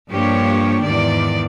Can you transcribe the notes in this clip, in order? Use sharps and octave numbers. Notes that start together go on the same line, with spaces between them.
G2 F3 A#3 D4 G4 C#5
E2 G#2 D#3 D5